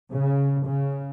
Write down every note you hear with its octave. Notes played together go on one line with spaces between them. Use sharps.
C#3
C#3